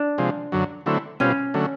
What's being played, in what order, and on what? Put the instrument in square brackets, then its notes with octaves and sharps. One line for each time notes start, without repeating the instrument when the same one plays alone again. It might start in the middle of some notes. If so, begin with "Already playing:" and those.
Already playing: [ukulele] D4
[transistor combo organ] C3 F3 G#3
F#2 D3 F#3
D3 F#3 A3 C4 E4
[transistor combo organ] B2 G3 C4 F4 [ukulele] C#4
[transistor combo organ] D3 F#3 A3